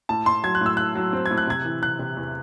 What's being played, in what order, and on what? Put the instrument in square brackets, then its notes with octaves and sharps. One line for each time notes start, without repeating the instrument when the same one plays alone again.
[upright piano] A2 A5
A2 C6
F#3 G#6
F#6
A2 E6
A2 F#6
F#3
C4
G#6
A2
F#6
C3 G#6
E3
C3 F#6
C3
E2